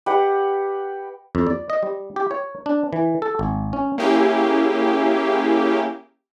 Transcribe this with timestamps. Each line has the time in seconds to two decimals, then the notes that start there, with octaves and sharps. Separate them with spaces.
0.06 G4 B4 D#5 F#5
1.35 F2
1.47 D5
1.70 D#5
1.83 G3
2.16 G4
2.31 C#5
2.66 D4
2.93 E3
3.22 A4
3.39 G#1
3.73 C#4
3.98 A#3 C#4 E4 G4 G#4